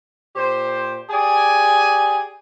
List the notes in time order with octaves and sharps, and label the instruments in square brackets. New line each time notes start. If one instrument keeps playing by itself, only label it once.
[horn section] A#2 G4 C5
G4 G#4 D5 G#5